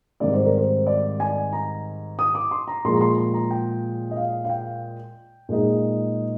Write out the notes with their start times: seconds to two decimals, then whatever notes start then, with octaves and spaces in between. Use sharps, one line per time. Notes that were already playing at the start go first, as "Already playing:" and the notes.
0.20 G#2 D#3 G3 C4 D5
0.33 C5
0.45 A#4
0.57 C5
0.87 D5
1.20 G#5
1.53 A#5
2.19 D#6
2.35 D6
2.51 C6
2.68 A#5
2.85 A#2 F3 G#3 C6
2.95 A#5
3.01 C6
3.18 C6
3.34 A#5
3.51 G5
4.11 D#5
4.16 F5
4.45 F5
4.49 G5
5.49 A#2 G#3 D#4